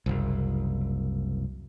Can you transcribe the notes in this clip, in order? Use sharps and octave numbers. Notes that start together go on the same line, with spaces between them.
F#1 C2